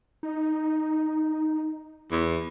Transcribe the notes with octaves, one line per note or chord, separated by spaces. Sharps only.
D#4
E2